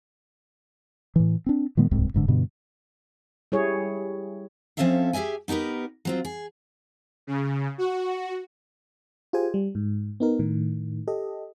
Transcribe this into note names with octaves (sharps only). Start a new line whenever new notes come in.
A2 E3
C4 D4
A#2 D#3 G#3 B3
D1 C2 G#2 C3
F#1 G#2 D3
G2 B2 D3
G3 E4 G#4 C#5
F3 C4 C#4 A4 E5 F5
G4 G#4 D#5 E5 G#5
B3 D#4 G4 A#4 B4
F#3 C4 F4
G#4
C#3
F#4
F4 G4 G#4 C5 G#5
G3
G#2
B3 D#4 A#4
A2 D#3
G4 A4 D#5